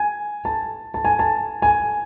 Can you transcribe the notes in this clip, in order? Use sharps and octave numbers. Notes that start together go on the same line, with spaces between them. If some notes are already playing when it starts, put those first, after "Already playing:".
Already playing: G#5
A5
A5
G#5
A5
G#5